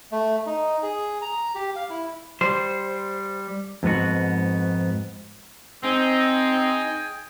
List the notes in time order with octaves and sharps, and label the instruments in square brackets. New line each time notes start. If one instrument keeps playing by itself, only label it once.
[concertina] A3
D#4
G#4
A#5
G4
F5
E4
[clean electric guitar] G3 C5
F2 G#2 B3 F#4
[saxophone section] C4 [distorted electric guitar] D#4 [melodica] G#4 G5 G#5